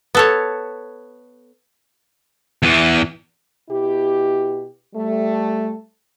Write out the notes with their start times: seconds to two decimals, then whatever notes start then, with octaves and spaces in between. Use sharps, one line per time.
0.15 B3 A4 C#5
2.63 E2 E3
3.70 B2 E4 G4
4.94 G3 A3